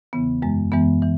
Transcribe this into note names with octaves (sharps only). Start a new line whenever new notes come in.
E2 C#3 E3 B3
F#2 E3 G#3
F#2 E3 G#3 B3
E3